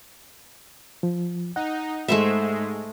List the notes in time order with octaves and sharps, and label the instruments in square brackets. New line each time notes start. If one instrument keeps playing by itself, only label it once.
[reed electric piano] F3
[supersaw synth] D#4 [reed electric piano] F#5
[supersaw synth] G#2 G#3 [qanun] A3 C5 E5